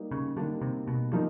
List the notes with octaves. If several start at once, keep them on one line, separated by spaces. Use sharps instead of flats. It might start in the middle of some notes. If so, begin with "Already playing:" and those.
Already playing: G3 A#3 D#4
C#3
D3 G3 A#3 D#4
C3
B2
F3 G3 A#3 D#4